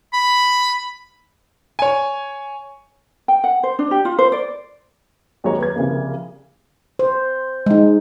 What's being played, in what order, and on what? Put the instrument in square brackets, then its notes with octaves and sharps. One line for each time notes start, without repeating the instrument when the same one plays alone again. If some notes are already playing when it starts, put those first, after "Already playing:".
[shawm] B5
[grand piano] C#5 G#5
[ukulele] G5
F#5
C5
D4
G4
F4
C5
D5
[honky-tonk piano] D#2 F#3 G#3 C#5 A#5
B4 G#6
C2 C#3 F3 A#3
[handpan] C5
G#3 D#4